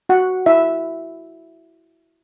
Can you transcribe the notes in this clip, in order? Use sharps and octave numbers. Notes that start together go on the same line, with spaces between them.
F#4 F#5
E4 E5